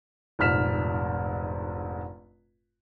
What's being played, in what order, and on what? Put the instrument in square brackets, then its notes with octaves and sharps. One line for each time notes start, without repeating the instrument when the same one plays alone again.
[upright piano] F1 A#1 G#2 F6 B6 E7